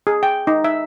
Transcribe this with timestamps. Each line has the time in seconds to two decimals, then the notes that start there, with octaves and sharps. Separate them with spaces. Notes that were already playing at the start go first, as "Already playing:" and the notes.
0.07 G#4
0.23 G5
0.47 D#4
0.64 E5